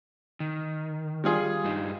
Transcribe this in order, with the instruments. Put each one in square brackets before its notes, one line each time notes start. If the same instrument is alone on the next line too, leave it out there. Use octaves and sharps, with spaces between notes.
[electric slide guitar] D#3
[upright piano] G3 F4 G#4
[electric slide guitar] G2 D#4